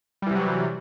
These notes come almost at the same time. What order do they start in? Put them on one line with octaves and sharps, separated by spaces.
G3 E3 C3 F#3